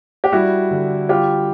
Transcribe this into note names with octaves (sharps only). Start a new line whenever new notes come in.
G4
G3 E4 F#4
D3
G3 F4 G4